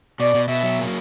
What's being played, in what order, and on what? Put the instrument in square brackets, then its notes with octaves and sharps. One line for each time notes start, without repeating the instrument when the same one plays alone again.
[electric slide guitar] B2 [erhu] D5
[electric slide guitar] B2
[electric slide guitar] B2 [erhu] E5
[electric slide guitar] F#3
A#3